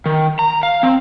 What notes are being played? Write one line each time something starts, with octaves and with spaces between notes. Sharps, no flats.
D#3
A#5
F5
C4